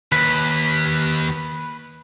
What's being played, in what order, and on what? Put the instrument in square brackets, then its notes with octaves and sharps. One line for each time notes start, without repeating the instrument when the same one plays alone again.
[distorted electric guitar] D#2 [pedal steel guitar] B4